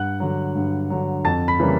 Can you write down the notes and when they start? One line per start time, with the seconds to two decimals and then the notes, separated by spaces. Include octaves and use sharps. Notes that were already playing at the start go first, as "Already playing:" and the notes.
Already playing: G2 F#5 F#6
0.20 D3 F#3
0.55 G2
0.90 D3 F#3
1.24 F2 A5 A6
1.48 B5 B6
1.60 C#3 E3 G3 A#3